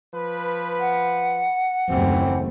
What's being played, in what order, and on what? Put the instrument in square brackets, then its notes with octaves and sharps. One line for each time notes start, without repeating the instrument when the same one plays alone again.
[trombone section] F3 B4
[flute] F#5
[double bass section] F#1 D#2 A3 [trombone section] E3 [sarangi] C4